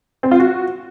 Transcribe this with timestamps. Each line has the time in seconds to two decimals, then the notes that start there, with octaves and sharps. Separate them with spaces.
0.23 C4
0.31 F4
0.40 F#4